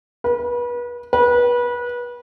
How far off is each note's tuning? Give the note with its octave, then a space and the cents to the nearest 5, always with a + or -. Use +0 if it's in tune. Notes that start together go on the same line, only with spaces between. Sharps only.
B4 -35
B4 -30